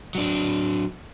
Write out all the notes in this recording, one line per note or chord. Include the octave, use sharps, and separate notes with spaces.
F#3 D4